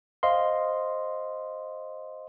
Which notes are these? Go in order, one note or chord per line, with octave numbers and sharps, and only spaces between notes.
C5 D#5 F5 C6